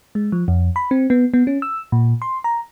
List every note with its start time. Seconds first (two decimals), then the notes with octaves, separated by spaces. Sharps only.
0.15 G#3
0.32 F3
0.48 F2
0.76 B5
0.91 C4
1.10 B3
1.34 B3
1.47 C#4
1.62 E6
1.92 A#2
2.22 C6
2.44 A#5